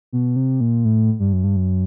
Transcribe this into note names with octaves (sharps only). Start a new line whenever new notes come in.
B2
C3
A#2
A2
G2
F#2
G2
F#2